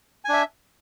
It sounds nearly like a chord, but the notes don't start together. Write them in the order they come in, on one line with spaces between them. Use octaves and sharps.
G#5 D4 E5